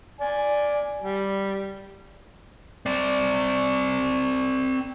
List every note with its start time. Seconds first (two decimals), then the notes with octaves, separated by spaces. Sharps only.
0.21 D5 G#5
1.02 G3
2.86 C4 D5